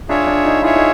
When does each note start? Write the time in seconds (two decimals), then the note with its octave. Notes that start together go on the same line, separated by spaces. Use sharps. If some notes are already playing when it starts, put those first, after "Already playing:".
0.09 D4 F4 G#4 C#5 E5
0.27 D4
0.45 D#4
0.62 E4 F4 G#4 C#5 E5
0.76 D#4